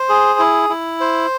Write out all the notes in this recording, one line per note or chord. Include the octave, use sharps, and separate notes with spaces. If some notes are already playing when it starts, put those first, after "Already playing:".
Already playing: C5
G#4
E4
E4
C5